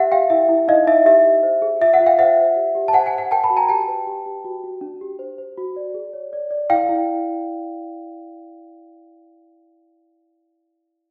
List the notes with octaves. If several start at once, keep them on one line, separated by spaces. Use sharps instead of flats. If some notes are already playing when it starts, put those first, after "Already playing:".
Already playing: G4 E5 F#5
G4 F5 G5
E4 E5
E4
D#4 D#5 F5
D#4 E5
G4 E5
G4
C5
G#4
F4 E5
E5 F#5
F4
F5 G5
C5 E5 F#5
C5
G4
G4
A5
C5 F#5 G#5
F#5 G#5
C5
F#5 G#5
A#4 G5 A5
A5 B5
F#4
G#5 A#5
G4 G5 A5
B4
G4
G4
F#4
F#4
D4
G4
C5
C5
F#4
D5
G#4
C#5
D5
D5
E4 F5 G5
E4